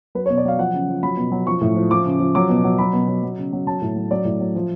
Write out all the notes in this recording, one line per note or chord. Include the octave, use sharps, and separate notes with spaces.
F#3 B4
C#5
B2
D5
F#3 F5
F3 F#5
C#3
F3
F#3 B5
B2
F#3
F3 C#6
A2
F3
F3 D6
C#3
F3
F#3 D6
B2
F#3
F#3 B5
B2
F#3
F#3
C#3
F#3
F#3 A5
A2
F#3
F#3 D5
A2
F#3
F3